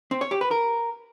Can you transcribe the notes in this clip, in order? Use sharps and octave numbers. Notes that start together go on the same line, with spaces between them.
C4
C#5
G4
B4
A#4